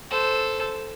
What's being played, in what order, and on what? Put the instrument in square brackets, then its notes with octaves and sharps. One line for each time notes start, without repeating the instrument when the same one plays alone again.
[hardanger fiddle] A4 C5